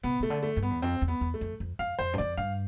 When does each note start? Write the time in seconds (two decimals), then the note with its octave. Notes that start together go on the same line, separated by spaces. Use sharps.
0.04 C3 B3
0.20 C3 A3
0.30 D3
0.43 A3
0.56 G2
0.63 B3
0.70 E2
0.82 F2 C4
1.01 E2
1.08 B3
1.21 E2
1.34 A3
1.41 F2
1.60 F2
1.79 F2 F5
1.99 F2 C5
2.13 G2
2.18 F2 D5
2.37 G2 F5